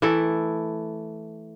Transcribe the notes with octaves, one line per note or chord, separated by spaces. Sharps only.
E3 A3 E4 A4